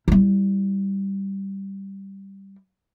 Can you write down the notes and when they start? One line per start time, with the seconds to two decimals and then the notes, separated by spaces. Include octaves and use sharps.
0.08 G3 E4